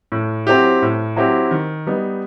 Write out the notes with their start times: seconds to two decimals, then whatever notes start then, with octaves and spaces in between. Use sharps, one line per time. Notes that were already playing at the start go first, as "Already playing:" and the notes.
0.12 A2
0.47 F#3 C4 E4 G4
0.82 A2
1.16 F#3 C4 E4 G4
1.51 D#3
1.86 G3 B3 D#4